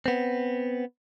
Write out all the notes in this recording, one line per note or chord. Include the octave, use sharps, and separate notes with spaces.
B3 C4